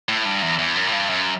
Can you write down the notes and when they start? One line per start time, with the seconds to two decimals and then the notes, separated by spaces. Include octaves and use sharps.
0.09 A2
0.25 G2
0.42 E2
0.59 E2
0.76 F#2
0.87 A2
0.93 G2
1.10 F#2